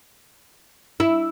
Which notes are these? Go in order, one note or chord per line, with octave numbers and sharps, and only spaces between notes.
E4